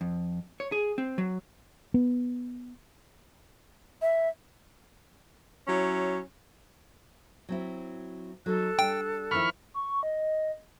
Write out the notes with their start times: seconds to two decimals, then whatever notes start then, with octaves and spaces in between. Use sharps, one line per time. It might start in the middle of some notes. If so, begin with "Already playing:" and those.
0.01 F2
0.60 C#5
0.72 G#4
0.98 C4
1.18 F#3
1.94 B3
4.02 E5
5.68 F#3 C#4 E4
7.49 F#3 C4 E4
8.46 F#3 D#4 A4 F#6
8.79 G3 D4 G5
9.31 D#3 F3 E4 B5 C#6 F6
9.74 C#6
10.03 D#5